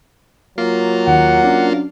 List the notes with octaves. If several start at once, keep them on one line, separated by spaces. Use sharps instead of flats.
F#3 A#3 F4
D#2 F#5
C#4 D4